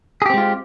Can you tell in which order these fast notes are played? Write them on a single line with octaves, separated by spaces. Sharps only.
G#4 G4 C4 G#3 F4